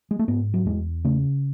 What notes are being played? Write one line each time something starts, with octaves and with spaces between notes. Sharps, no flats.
G#3
A3
G#2 B3
F#3
E2 G#3
C#3 A3